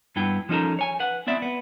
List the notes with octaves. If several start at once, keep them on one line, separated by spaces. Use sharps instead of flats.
G2 B3 E4 G5
F3 C#4 D#4 A4 A#4
C#5 G#5
B4 F#5
B3 C4 E4 D5 E5
B3